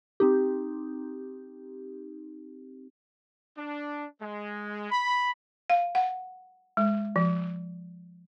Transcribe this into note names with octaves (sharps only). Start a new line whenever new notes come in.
C4 D#4 G4
D4
G#3
B5
F5
F#5
G#3
F3